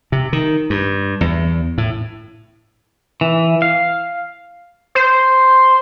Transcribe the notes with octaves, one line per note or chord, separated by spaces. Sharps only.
C3
D#3
G2
E2
A2
E3
F5
C5